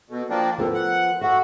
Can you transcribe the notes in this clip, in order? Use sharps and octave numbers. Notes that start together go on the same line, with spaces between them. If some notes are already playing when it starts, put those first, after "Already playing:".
B2 A4
F3 A#3 D4 G5
D3 F3 B3 A4 A#4
F#5
F#4 A4 E5 F#5